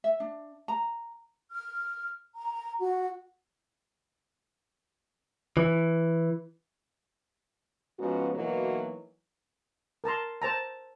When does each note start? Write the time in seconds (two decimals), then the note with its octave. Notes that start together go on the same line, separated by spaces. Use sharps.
0.04 E5
0.20 D4
0.68 A#5
1.51 F6
2.36 A#5
2.80 F#4
5.57 E3
8.00 G#2 F3 B3 C#4 F#4
8.34 B2 E3 F#3 A#3 D#4 F#4
10.04 A#4 A5 A#5 C6
10.42 C5 A5 A#5